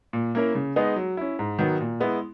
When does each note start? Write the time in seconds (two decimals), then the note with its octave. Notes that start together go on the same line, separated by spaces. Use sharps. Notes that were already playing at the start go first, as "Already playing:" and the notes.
0.13 A#2
0.35 A#3 C#4 E4 A#4
0.55 C#3
0.76 G#3 B3 D#4 G#4
0.96 F#3
1.17 C#4 E4
1.39 G#2
1.59 D#3 F#3 B3
1.81 A#2
2.00 G#3 B3 E4